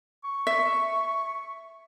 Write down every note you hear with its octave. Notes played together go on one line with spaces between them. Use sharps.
C#6
E5